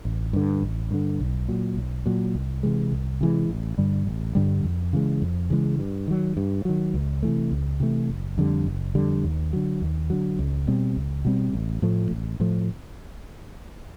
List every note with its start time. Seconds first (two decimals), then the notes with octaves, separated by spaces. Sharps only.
0.05 A1
0.33 G2 D3
0.62 A1
0.91 G2 D3
1.20 B1
1.48 A#2 F#3
1.77 B1
2.06 A#2 F#3
2.35 C2
2.63 C3 E3 G#3
2.92 C2
3.21 C3 E3 G#3
3.49 A1
3.78 G2 D3 G3
4.07 A1
4.35 G2 D3 G3
4.64 F2
4.93 C#3 E3 G#3
5.22 F2
5.50 C#3 E3 G#3
5.79 G2
6.08 D#3 F#3
6.37 G2
6.65 D#3 F#3
6.94 C#2
7.23 C3 E3 A3
7.51 C#2
7.80 C3 E3 A3
8.09 F#1
8.38 F2 D3 G3
8.66 F#1
8.95 F2 D3 G3
9.24 D#2
9.53 D3 F#3
9.81 D#2
10.10 D3 F#3
10.39 C#2
10.67 B2 G3 C4
10.96 C#2
11.25 B2 G3 C4
11.53 A1
11.82 A2 F3 A3
12.11 A1
12.40 A2 F3 A3